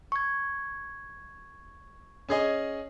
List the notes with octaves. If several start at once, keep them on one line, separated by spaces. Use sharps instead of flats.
C#6 G#6
C#4 G#4 D#5